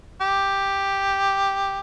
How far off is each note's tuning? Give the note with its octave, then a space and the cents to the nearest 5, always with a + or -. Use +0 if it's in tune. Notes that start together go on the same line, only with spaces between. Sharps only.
G4 +5